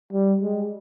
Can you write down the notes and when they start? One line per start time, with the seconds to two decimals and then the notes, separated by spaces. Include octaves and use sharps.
0.13 G3
0.41 G#3